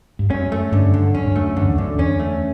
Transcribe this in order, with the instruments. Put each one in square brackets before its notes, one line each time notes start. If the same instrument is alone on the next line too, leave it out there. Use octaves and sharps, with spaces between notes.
[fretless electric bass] G2
[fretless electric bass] F#2 [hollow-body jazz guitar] C#4
[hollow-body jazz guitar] A3
[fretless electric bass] G2 [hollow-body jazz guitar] D3
[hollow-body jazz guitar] D3
[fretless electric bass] F#2 [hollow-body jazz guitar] C#4
[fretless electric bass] G2
[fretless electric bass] F#2 [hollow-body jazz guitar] A3
[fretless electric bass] F#2 [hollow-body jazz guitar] D3
[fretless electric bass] E2
[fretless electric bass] F#2 [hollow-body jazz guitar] D3
[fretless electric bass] E2 [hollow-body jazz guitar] C#4
[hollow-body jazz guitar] A3